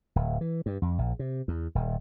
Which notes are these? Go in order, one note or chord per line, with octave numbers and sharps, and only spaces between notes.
D1
E3
G2
F2
A#1
C3
E2
D#1